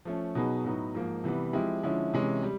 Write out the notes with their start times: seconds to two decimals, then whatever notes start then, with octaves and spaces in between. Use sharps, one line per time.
0.05 F3 A3 C#4
0.35 B2 F#3 B3 D#4 G#4
0.64 A2 F#3 B3 D#4 F#4
0.95 G#2 F3 A#3 D#4
1.24 C3 E3 G3 B3
1.53 F3 G#3 C4 E4 G4
1.83 D3 F3 G#3 C#4 E4
2.13 C3 E3 G#3 C#4
2.43 G3